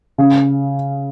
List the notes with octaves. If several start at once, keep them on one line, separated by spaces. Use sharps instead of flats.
C#3